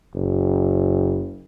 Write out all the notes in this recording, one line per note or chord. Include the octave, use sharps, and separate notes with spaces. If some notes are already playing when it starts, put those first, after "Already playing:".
F#1